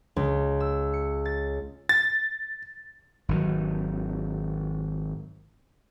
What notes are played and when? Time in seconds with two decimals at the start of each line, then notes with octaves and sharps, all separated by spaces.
0.16 C#2
0.60 E6
0.93 C#7
1.25 A6
1.89 A6
3.29 G#1 D#3 F#3